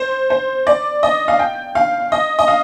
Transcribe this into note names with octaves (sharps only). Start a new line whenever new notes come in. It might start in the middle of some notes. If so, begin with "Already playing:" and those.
Already playing: C5
C5
D5
D#5
F5
G5
F5
D#5
D#5
F5